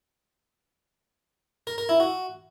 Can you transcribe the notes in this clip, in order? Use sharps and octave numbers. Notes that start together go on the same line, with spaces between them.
A#4
A#4
E4
F#4